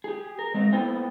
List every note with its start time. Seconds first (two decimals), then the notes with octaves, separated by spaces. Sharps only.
0.04 G4 G#4
0.39 A#4
0.54 G#3 C4 A#4
0.73 A#3 B3 E4 A4 C5 G5